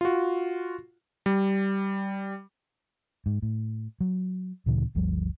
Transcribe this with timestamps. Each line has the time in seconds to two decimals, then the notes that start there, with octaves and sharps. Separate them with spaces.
0.01 F4 F#4
1.26 G3
3.26 G#2
3.42 A2
4.00 F#3
4.66 D2 A#2 C#3 E3
4.95 G1 D2 F3 G3